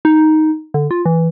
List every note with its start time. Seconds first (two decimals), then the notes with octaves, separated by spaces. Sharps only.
0.05 D#4
0.74 D3
0.91 F4
1.06 E3